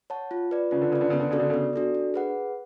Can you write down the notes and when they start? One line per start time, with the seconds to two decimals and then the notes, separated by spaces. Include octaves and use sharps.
0.10 C#5 F#5 A5
0.31 F4
0.51 B4 D5
0.71 C#3 F4
0.81 D3
0.92 C#3 B4 D5
1.01 D3
1.10 C#3 B3
1.20 D3
1.31 C#3 D4 F#4 A4 D5
1.40 D3
1.50 C#3 B3
1.73 D4 F#4 A4 D5
1.95 D4
2.14 G#4 B4 F#5